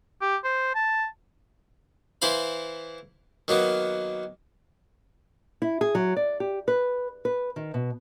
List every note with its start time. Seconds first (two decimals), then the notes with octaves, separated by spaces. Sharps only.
0.21 G4
0.44 C5
0.75 A5
2.22 E3 E4 C5 F5 B5
3.48 D#3 F#3 A#3 B3
5.62 E4
5.81 G#4
5.95 F#3
6.16 D5
6.40 G4
6.68 B4
7.25 B4
7.56 D#3
7.74 B2